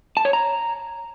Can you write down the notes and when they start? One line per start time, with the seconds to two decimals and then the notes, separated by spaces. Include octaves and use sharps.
0.17 A5
0.25 C#5
0.33 A#5